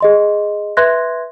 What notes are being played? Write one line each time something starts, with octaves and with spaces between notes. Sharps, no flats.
G#4 D#5 C6
B4 E5 C6 F#6 G#6 A#6